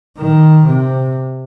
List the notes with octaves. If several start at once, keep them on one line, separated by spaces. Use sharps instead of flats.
D#3
C3